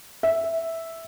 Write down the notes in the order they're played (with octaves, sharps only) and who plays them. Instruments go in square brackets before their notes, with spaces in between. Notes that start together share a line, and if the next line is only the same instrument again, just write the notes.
[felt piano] E5